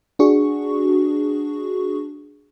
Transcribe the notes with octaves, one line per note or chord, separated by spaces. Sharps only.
D4 F#4 G#4 C#6